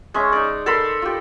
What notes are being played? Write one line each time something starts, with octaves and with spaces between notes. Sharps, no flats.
G#3 C#4 E5
D#4 D5
A4 A#4 B5 C6
F4 G4